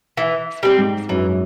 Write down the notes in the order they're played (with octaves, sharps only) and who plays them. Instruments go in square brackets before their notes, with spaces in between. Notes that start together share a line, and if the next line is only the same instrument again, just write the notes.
[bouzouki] E3
G3 C4
[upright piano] G#2
[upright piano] F#2 [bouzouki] E3